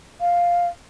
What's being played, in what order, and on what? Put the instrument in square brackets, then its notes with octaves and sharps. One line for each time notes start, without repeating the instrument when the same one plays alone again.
[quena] F5